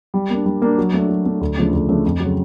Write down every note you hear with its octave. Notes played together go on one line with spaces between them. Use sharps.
G3
A#3 D4
G3
A#3 D4
F#3
A3 D4
F#3
A3 D4
D2
C#3 F3 A3 D4
D2
C#3 F3 A3 D4
F2
C#3 F#3